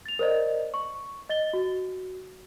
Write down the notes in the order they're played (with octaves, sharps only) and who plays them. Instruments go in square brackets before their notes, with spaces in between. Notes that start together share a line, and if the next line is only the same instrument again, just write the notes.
[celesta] A6 F7
A#4 C5 D5 D#5
C#6
D#5 A6 G7
F#4